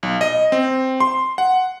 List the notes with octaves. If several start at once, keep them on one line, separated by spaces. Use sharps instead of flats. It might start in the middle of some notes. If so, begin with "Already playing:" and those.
B1
D#5
C4
C6
F#5